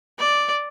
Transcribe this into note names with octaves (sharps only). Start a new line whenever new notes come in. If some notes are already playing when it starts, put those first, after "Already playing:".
D5